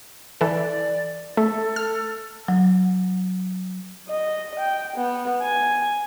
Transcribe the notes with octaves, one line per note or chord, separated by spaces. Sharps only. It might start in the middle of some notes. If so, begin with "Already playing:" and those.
E3 A4 D5
A3 A4
F6
F#3
D#5
G5
B3
G#5